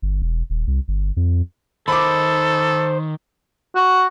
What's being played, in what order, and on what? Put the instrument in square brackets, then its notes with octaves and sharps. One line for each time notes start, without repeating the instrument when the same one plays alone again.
[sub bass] G1
E1
D#1
C2
G1
F2
[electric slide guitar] D#3 [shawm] A4 [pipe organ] C5 [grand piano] B5 D6
[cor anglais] F#4